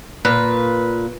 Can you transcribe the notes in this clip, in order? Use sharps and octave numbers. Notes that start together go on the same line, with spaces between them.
A#2 B4